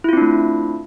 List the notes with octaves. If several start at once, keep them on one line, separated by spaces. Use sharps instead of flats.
A3 C4 D4 E4 F4